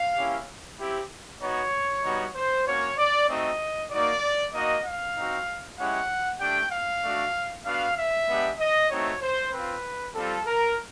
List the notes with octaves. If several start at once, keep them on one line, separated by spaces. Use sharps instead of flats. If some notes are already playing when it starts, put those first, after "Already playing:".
Already playing: F5
A#3 C#4 E4 G4
C4 E4 G4
B3 D#4 F#4 C#5
G3 B3 D#4 F#4
C5
A#3 C#4 F#4 C#5
D5
A3 C4 D#4 F#4 D#5
A#3 D#4 F#4 D5
A#3 D#4 F#4 D#5
F5
C4 D#4 F#4
G#3 C#4 E4 G4 F#5
A3 D4 G4 G5
F5
A3 D4 F#4
B3 D4 F#4 F5
E5
G#3 B3 D4 G4
D#5
A3 C4 D#4 F#4 C#5
C5
C4 F4 B4
G3 C4 F4 A4
A#4